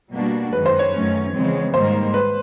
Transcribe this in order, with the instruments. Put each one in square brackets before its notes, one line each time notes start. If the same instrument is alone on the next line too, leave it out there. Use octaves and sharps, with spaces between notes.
[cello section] B2 G3 A#3 D4 F#4
[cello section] F#2 D#3 G#3 [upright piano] B4
[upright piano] C5
C#5
[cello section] F#2 D#3 F#3 A3 C#4
E2 C#3 F3 G#3 C4
[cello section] G#2 D#3 G3 A#3 [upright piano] C5
[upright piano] B4